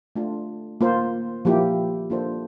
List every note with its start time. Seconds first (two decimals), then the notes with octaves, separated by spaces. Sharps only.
0.16 A3 D4 F4
0.81 A#3 F4 C5
1.45 F3 A#3 E4 G4
2.10 A#3 D4 F4 A4 C5